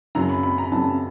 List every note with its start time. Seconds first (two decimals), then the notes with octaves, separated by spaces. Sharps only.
0.15 F#2 C#3 F#3 A#5
0.30 B5
0.43 B5
0.58 A#5
0.71 F#2 C#3 F#3 A5